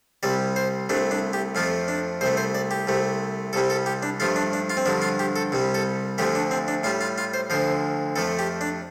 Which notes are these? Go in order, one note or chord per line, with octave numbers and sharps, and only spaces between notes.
C2 C3 G3 D5
C5
C2 C3 A3 D4
D4
G4
F2 F3 A3 F4
D4
C2 C3 A3 C5
C5
D5
G4
C2 C3 A3
C2 C3 G3 A4
A4
G4
D4
G2 F3 A3 F4
D4
D4
F4
C4
G2 D3 F3 D4
F4
G4
A4
C2 C3 G3
A4
D2 D3 F3 A3 G4
D4
C4
D4
A2 G3 F4
F4
F4
C5
D2 D3 F3 C5
F2 F3 A3 A4
G4
D4